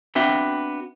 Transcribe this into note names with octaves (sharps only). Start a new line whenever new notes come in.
B3 C4 D4 F#4 E5 G5